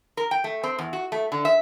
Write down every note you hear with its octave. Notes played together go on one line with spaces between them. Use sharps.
A#4
G5
A3
C4
E2
F#4
A3
D3
E5